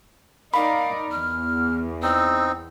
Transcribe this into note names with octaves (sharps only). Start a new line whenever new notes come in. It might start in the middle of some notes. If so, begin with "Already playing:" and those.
D#4 A#4 D5 F5 B5
E2 F6
C4 D#4 E6